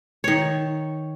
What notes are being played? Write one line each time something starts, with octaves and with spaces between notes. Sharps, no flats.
D#3 C#5